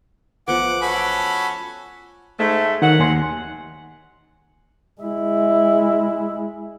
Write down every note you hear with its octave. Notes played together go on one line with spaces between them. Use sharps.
A1 F3 A3 B3 F#5 D6
C#4 F#4 A4 B5
G#2 A3
D#3 F#3 F#5
D#2 G#5 C6
G#3 E4